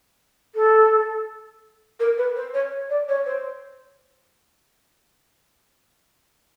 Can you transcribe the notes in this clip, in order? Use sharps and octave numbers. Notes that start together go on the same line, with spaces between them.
A4
A#4
B4
C5
C#5
D5
C#5
C5